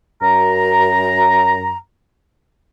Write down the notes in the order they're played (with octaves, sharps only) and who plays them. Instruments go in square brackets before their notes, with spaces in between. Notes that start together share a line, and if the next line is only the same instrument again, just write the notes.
[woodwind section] F#2 A#5